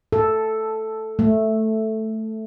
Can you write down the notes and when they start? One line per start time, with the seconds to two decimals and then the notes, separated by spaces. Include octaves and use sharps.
0.13 A4
1.19 A3